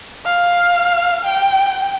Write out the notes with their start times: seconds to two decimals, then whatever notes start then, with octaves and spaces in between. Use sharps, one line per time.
0.25 F5
1.25 G5